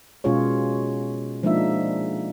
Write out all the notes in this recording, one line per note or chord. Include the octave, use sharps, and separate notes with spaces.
B2 G#3 C#4 F4 G#4 C#5
F3 G#3 A#3 D4 D#4 E5